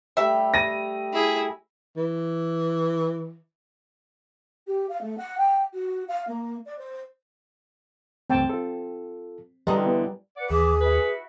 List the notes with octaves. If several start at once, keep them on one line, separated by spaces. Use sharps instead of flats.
G3 A3 E5 G5
A#6 D#7
E4 G#4
E3
G4
F5
A3
F#5
G5
F#4
F5
A#3
D5
C5
C#2 G2 A3 C4 G5 A5
F4 A4
D3 E3 G3 C4 A#4 D#5
B3 D4 E4
B4 D5 F#5
D#2 E3 G#4 E5 D6
E4 F#4 B4